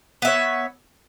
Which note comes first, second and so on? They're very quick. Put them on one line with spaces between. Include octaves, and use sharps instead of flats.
B3 E5 C#5